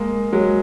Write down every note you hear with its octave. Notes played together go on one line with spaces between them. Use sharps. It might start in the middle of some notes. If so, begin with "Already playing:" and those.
Already playing: G#3 A#3
F#3 G#3